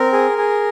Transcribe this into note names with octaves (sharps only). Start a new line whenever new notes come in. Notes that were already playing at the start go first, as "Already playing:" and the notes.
Already playing: C4 A#4
G#4
G#4